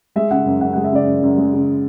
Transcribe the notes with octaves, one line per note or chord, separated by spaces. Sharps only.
G#3 E5
C#3 F#5
F#2
F#2 F#5
G#3 F#5
E5
C#3 D5
F#2
F#2
G#3
C#3